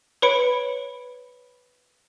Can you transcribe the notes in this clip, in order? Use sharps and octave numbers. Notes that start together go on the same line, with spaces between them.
B4 C#5 B5 C#7 D7